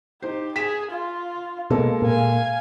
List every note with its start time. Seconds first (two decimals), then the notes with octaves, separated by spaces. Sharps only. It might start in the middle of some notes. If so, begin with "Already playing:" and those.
0.22 D#4 G4 C5
0.56 G#4 B6 E7
0.91 F4
1.70 B2 G#3 A#3 A4
2.02 A#2 F5 G#5